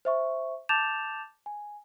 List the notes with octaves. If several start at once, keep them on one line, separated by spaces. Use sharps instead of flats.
C5 E5 C#6
A5 D6 G6 A6 E7 F7
G#5